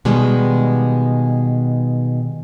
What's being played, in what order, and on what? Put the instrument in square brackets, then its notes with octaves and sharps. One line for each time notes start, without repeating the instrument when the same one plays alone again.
[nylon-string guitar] B2 D#3 G3 G#3